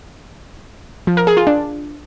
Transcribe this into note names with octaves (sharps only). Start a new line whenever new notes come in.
F3
A#4
G#4
F4
D4